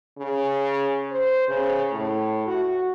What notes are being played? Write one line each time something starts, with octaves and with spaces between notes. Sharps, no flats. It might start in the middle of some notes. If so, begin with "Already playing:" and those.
C#3
C5
C#3
A2
F#4